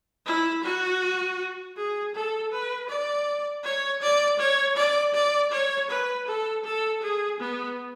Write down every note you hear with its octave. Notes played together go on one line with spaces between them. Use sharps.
E4
F#4
G#4
A4
B4
D5
C#5
D5
C#5
D5
D5
C#5
B4
A4
A4
G#4
B3